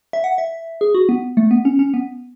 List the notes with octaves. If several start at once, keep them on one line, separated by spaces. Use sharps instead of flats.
E5
F#5
E5
G#4
F#4
B3
A3
B3
C#4
C#4
B3